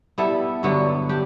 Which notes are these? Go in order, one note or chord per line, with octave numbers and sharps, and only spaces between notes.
G3 B3 E4 A4
G2 D3 F#3 B3
D4 G4